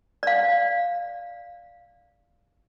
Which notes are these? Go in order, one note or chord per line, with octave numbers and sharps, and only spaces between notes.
D5 F5